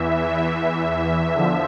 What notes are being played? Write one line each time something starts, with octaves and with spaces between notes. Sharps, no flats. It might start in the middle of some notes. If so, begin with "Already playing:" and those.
Already playing: E2 E3 E5
E5
E2 D3 F3 E5